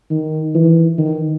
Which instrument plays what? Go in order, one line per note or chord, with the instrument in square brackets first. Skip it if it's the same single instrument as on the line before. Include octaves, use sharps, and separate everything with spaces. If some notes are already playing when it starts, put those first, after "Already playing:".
[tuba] D#3
E3
D#3